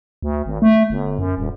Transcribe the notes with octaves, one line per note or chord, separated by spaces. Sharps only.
D2
G#1
A3
G1
F#2
D#1